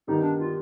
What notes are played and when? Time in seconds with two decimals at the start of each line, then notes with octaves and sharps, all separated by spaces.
0.07 G2 D#3 G3 B3 D#4
0.22 D4
0.40 F4